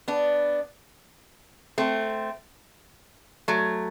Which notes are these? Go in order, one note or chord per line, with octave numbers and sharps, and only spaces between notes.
B3 D4
A3 C4
F#3 A3